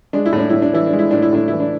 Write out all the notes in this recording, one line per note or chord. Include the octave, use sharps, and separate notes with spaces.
G#3 D4
E4
A2
D4
A2 E4
D4
E3 E4
D4
G#3
E4
A2 D4
E4
A2 D4
E3 E4
D4